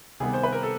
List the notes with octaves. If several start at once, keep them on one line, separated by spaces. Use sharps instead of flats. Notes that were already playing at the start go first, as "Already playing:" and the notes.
C3 D#3 G3 B3 G#4
C5
B4
A#4
A4